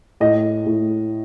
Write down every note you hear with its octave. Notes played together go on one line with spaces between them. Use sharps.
A2 D#5
A2